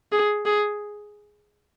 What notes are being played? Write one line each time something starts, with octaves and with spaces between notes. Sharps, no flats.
G#4
G#4